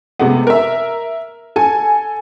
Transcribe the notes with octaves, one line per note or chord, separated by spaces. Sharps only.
C3 G#3 A3 B3
A#4 E5
A4 G#5